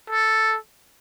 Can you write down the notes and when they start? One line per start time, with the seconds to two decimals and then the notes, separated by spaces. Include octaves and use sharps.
0.10 A4